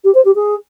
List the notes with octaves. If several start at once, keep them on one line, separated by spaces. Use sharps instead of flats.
G4
C5
G4
G#4